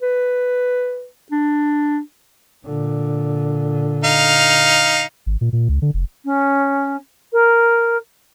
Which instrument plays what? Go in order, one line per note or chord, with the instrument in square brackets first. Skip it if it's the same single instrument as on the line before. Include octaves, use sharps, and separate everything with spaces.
[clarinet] B4
D4
[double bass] A#2 D3
[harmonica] D#4 F5
[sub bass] G#1
A#2
A#2
C#2
D3
F1
[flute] C#4
A#4